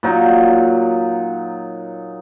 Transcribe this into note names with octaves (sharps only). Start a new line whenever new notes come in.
A#2 F#3 D#4